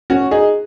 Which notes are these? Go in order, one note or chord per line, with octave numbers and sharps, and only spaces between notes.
C#4 F#4
D#4 G#4